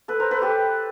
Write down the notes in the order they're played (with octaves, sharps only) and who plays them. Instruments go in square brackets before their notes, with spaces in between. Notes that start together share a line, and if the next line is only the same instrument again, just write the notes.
[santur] A4 B4
A#4 C5
A4 B4
G4 A4